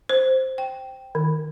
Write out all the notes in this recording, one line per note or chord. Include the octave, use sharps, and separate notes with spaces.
C5
G5
D#3